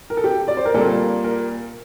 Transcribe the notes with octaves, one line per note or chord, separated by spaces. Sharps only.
A#4
A4
G4
D5
C5
A#4
A#2 G3 A#3 A4
A#4